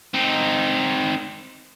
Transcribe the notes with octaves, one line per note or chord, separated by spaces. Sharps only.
C4 D#4